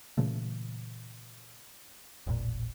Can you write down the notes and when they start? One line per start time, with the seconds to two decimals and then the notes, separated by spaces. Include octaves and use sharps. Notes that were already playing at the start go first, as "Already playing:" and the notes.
0.18 A#2 C#3 E3 A3
2.27 E1 A1 A#2